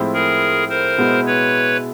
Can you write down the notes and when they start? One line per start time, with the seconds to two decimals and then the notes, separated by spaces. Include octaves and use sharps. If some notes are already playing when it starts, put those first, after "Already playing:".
Already playing: A2 F3 G#3 C4 E4
0.14 G#4 A#4
0.69 A#4 C5
0.98 B2 G#3 B3 E4
1.26 B4 C#5